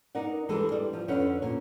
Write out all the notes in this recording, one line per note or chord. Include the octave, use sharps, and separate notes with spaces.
D#4 A#4 D5 F#5
E3 G3 G#3 D4 G#4 A4
G3 D5
F3
F2 D3 C#4 B4 F#5
A#2 C#4